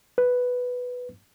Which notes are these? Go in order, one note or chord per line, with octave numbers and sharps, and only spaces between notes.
B4